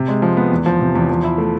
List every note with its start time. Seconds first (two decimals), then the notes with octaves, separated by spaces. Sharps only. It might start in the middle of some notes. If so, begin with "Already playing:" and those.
Already playing: C3
0.08 G#3
0.22 F3
0.37 B3
0.52 E2
0.66 F3
0.80 C3
0.95 E2
1.09 F3
1.24 E4
1.38 A3